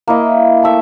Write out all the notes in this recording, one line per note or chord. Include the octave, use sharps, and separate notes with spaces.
A#3 E4 D#5
A3 E5